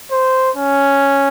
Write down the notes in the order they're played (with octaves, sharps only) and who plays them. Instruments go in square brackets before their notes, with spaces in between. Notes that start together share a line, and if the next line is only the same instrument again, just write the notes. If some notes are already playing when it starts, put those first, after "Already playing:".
[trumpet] C5
C#4